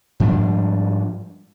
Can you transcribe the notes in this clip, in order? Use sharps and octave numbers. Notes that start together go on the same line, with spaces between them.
G#2 F3 G3 D4